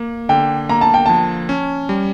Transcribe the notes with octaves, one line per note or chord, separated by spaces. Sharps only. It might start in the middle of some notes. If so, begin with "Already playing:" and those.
Already playing: A#3
D3 G5
A#3 A#5
A5
G5
F3 A5
C#4
G3